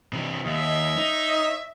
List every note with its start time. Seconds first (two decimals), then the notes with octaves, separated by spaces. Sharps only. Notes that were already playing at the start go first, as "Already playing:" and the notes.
0.13 C3 E3
0.45 D#2 C#5 D#5 E5
0.97 D#4